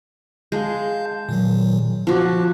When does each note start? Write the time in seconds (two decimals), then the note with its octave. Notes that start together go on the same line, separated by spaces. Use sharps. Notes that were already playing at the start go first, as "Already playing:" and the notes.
0.52 G#3 F5 A5 G6
1.29 A#2 D#3 F#3
2.07 F3 F#4 A5 D6